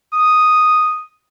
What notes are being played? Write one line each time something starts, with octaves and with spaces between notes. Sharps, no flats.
D#6